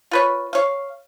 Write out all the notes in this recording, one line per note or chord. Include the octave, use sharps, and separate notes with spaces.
F4 B4 C#5
C#5 F5